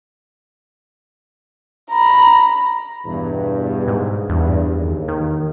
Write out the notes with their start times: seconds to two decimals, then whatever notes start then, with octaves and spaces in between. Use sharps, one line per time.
1.90 A#5 B5
3.05 E2 G2 B2
3.88 G#2
4.30 E2 G2
4.76 D#2
5.08 D#3